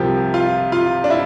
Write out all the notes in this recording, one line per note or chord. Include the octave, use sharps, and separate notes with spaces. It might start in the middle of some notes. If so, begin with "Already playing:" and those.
Already playing: C2 C3 F3 G4 A#4
F4
F4
D4
E4